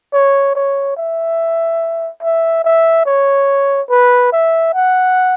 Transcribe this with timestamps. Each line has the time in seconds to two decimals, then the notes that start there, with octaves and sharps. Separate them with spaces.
0.13 C#5
0.55 C#5
0.97 E5
2.22 E5
2.64 E5
3.06 C#5
3.90 B4
4.32 E5
4.74 F#5